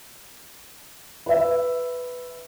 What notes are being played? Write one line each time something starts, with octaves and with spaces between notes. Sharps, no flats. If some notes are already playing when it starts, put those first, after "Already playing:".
B4 E5